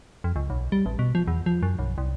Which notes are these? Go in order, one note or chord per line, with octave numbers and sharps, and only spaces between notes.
F2
C#2
B1
G3
A1
B2
F3
E2
F3
F#2
B1
C2